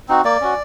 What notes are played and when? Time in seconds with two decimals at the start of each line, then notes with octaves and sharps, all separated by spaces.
0.08 C4 D#4 F#4
0.24 A#3 D5
0.41 C#4 F#4